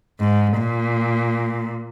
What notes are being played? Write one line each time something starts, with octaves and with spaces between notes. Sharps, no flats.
G#2
A#2